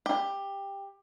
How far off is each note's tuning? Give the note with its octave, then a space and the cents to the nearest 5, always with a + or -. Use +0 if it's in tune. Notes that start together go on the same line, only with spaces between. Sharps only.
G4 +15